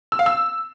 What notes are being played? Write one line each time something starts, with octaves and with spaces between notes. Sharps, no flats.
E6
F5
E6